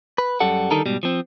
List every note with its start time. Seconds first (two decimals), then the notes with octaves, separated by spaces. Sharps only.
0.18 B4
0.40 F#2 G3 A4 F#5
0.71 D3 D#3 G3 D#4 A4 A#4
0.86 G#2 B2 G3
1.03 F3 C4